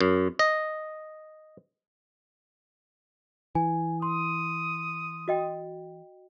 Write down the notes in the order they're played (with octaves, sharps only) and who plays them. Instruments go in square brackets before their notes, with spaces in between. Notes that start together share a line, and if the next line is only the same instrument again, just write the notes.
[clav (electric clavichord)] F#2
D#5
[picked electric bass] E3 [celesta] G#5
[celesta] C6 [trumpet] D#6
[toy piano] F#4 D#5 G5